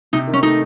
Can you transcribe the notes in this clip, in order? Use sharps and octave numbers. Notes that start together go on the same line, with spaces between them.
C3 D#4
D#3
C#4
A3 D#4